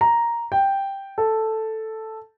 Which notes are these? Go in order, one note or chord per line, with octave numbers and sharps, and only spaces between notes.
A#5
G5
A4